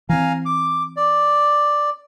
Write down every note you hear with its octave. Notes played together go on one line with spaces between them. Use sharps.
E3 C4 F5 G#5 A#5
D6
D5